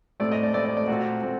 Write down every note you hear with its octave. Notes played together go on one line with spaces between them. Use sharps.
A2 A3 C4 D5
D#5
D5
A2 A3 C4 D5
D5
D5
A#2 A3 C4 F#4
A#2 A3 C4